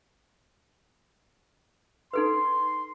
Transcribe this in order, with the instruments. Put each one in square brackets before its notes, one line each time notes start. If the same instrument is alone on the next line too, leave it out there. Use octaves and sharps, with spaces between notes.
[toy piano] D#4 A4 B4 [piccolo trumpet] C6